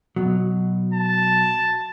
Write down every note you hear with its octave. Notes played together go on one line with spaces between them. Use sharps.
B2 F#3
A5